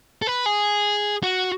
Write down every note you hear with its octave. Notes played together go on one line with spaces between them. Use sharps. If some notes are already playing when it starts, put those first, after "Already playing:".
A4
B4
G#4
F#4